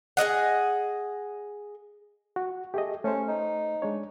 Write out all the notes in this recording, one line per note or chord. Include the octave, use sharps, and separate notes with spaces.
G#4 A#4 D#5 F#5
F#4
A3 G4 G#4 D#5
A3 C#4 C5
D#4
G#3 D4 C#5